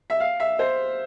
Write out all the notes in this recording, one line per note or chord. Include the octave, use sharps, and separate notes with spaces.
E5
F5
E5
C5